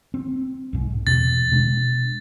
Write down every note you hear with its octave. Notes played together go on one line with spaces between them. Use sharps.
C4
B1 G#2
E2 B2 A6
B2 G#3 D4